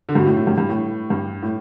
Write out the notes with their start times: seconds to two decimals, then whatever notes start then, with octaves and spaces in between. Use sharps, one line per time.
0.09 D3
0.15 G2 B2
0.26 A2
0.37 A2
0.47 G2
0.58 G2
0.69 A2
1.10 G2
1.42 A2